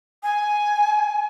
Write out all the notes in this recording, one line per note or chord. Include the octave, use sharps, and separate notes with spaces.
G#5